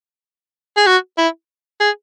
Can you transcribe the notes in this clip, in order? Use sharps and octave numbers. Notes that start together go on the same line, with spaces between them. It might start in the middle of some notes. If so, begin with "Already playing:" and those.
G#4
F#4
E4
G#4